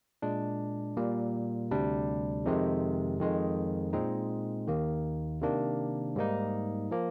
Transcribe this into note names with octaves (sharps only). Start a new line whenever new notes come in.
A#2 G#3 D4
A#2 G3 A#3
D2 C3 G3 D4
F2 C3 D#3 G#3
F2 D#3 G#3
A#2 G#3 C4 D#4
D#2 D#3 A#3
C3 D#3 A#3 D4
G#2 G3 A#3 D#4
F3 A#3